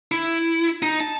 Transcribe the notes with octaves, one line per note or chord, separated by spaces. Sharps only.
E4
D#4
A5